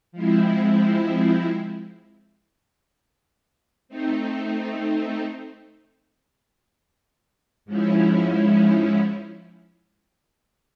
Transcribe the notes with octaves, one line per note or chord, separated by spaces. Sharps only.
F3 G#3 C4 E4
A3 C4 D#4
G#2 F3 G#3 C#4 E4